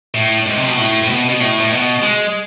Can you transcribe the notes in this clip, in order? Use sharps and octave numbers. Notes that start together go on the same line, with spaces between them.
A2
G#2
C3
B2
A2
A2
B2
B2
A2
A2
B2
G#3